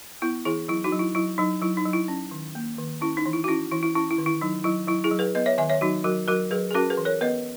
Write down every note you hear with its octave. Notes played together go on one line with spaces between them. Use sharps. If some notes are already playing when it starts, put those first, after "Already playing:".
B3 E4
E3 E4 G#4
F#3 E4
D#4 F#4
F#3
E4
F#3 E4
F#3 D#4
F#3 E4
D#4
F#3
E4
C#4
D#3
A#3
D#3
C#4 E4
D#4
E3
E4
F#4
C#4 E4
E3 E4
E4
C#4 E4
E4
D#3
E4
F#3 D#4
F#3 E4
F#3 E4
E4 G#4
F#3
G#4 B4
B3 B4 D#5
C#5 E5
D#3 E5 G#5
C#5 E5
F#3 D#4 F#4
F#3 F#4 A#4
F#3 F#4 A#4
F#3 G#4 B4
G#4
C#4 F#4 A#4
G#4 B4
E3
A#4 C#5
B3 B4 D#5